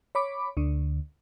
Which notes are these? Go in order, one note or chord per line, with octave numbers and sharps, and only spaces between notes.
C#5 B5 D6
D2 D3